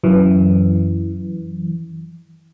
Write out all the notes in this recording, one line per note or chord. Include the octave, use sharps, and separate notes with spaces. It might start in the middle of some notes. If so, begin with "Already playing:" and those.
F#2 E3